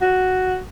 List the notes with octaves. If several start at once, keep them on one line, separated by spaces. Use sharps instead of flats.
F#4